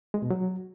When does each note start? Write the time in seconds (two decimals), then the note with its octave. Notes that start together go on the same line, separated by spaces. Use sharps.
0.14 G#3
0.22 B2
0.30 F#3